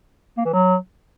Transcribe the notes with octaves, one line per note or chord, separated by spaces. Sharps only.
A#3
E3
F#3